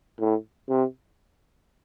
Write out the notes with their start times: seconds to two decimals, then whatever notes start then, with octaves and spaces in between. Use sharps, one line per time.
0.20 A2
0.69 C3